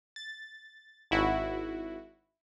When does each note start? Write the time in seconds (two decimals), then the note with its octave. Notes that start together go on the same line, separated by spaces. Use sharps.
0.16 A6
1.11 G#1 E4 F#4